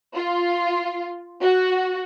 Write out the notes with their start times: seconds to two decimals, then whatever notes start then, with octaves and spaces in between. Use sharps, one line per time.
0.15 F4
1.41 F#4